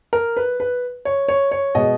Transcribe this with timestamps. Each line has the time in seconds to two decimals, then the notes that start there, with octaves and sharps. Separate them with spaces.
0.13 A#4
0.37 B4
0.60 B4
1.05 C#5
1.28 C#5
1.52 C#5
1.75 B2 G#3 D#5